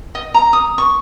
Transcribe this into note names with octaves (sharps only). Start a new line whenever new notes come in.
D#5
A#5
D#6
C#6